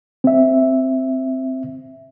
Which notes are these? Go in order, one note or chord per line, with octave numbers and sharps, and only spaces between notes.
C4 E5